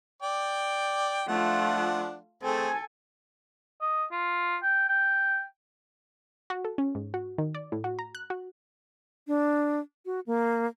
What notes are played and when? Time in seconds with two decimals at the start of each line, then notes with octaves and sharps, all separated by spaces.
0.22 D5 G5
1.28 F3 A3 D4 F4 F#5
2.43 A3 C4 G#4 A4 G#5
3.81 D#5
4.12 F4
4.63 G5
4.89 G5
6.50 F#4
6.65 A4
6.78 C#4
6.95 G#2
7.14 F#4
7.38 D#3
7.54 D5
7.72 A2
7.84 F#4
7.99 A#5
8.15 F#6
8.30 F#4
9.27 D4
10.06 F#4
10.27 A#3